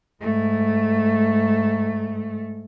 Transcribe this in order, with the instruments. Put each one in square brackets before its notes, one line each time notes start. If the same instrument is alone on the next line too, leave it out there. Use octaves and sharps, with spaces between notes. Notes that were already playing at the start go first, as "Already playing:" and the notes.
[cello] G#2 A3